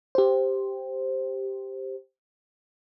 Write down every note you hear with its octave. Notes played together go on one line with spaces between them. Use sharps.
G4 C5